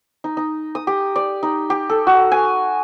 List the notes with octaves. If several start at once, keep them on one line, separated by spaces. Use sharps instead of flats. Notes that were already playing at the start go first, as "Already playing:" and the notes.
D#4
D#4
D#6
G4
D5
D#4
G4
A4
F#4
G#5